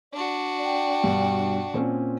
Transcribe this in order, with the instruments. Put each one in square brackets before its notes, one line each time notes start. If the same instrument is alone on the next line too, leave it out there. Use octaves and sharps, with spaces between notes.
[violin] D4 F#4 [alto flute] D5
[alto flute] G5
[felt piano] G2 B2
A#2 C4 C#4